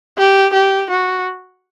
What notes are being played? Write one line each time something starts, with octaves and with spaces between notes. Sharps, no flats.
G4
G4
F#4